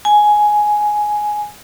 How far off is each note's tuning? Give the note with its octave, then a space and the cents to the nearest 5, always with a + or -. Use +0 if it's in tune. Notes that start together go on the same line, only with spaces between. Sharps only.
G#5 +10